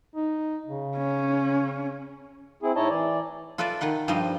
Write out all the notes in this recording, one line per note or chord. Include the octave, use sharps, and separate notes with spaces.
D#4
C#3
C#4
C4 E4 G#4
A2 D#4 E4 C#5 D#5 A5
E3 D5
F4 A4 B4 D5 E5
D#3 B4 F#5 C6
G2 F3 G3 D#5 C6